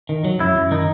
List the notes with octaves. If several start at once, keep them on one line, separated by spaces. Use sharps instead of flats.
D#3
F#3
F#2 E4
F#2
D#3 D#4